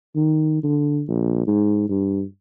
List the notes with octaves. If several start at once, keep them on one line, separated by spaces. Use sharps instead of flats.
D#3
D3
A#1
G#2
G2